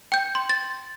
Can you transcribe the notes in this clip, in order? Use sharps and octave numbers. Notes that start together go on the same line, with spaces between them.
G5 G6
C6
A6